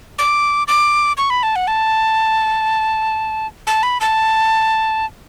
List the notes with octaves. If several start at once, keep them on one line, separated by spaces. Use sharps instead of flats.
D6
D6
C#6
B5
A5
F#5
A5
A5
B5
A5